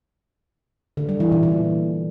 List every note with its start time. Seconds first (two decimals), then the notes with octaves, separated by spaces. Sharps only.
0.97 D3
1.09 G3
1.20 E3
1.32 A#2
1.43 A#2